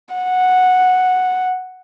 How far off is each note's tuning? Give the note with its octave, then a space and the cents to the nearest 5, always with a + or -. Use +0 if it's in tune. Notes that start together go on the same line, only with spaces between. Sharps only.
F#5 -5